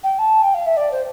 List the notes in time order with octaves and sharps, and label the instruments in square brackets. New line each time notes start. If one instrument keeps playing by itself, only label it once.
[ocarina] G5
A5
G5
F5
E5
D5
C5